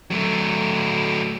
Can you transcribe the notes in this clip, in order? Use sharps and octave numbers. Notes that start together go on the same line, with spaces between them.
F#3 A3